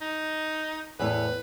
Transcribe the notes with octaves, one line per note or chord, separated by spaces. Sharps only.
D#4
E2 A2 B4 C#5